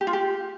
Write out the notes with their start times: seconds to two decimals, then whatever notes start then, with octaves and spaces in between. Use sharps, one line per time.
0.01 G4
0.07 F4
0.13 G4